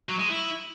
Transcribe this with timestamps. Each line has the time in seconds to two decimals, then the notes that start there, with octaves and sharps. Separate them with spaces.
0.09 F#3
0.19 G#3
0.29 E4